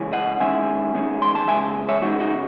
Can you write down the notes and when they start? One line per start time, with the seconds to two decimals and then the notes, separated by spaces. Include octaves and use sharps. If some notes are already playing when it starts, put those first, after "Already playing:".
Already playing: C#3 E3 G#3 C#4
0.13 D#5 F#5
0.40 E2 D#3 G#3 C#4 E5 G#5
0.94 E2 D#3 G#3 C#4
1.22 C6
1.35 A5
1.48 E2 C#3 G#3 E5 G#5
1.89 C#5 E5
2.02 E2 C#3 G#3 D#4 F#4
2.20 D#4 F#4